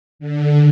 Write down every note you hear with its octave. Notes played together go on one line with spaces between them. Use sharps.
D3